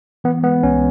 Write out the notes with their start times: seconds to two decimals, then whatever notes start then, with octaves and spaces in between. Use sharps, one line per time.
0.24 E3 B3
0.43 G#3 B3
0.63 C2 C#4